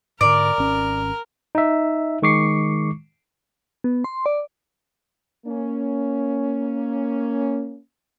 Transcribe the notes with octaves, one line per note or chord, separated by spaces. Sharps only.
G#2 D3 A#4 D5
G#1 C#4
D#4 E5
D#3 G#3 C#6 D6 C7 C#7
B3
C6
D5
A#3 C#4